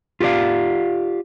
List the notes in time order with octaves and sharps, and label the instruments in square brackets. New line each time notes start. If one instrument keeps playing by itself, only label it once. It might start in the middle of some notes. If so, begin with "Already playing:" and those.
[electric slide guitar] F4 G4 A#4 D5 F5